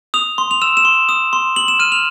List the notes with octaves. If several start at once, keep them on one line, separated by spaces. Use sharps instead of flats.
D#6 F7
C6
F7
E6 E7
E7
C6
D#6
C6
C6 F#7
E7
F6 D#7
F7